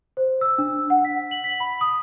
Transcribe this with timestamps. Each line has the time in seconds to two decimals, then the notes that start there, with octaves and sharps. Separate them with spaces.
0.17 C5
0.41 E6
0.58 D4
0.90 F#5
1.05 B6
1.31 F#7
1.44 B6
1.60 B5
1.81 D#6